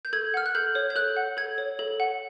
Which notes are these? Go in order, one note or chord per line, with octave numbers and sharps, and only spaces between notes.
G6
A4 G#6
F#5 F6
F#6
A4 G6
C#5
G6
A4 F#6
F#5
A4 G#6
C#5
A4
F#5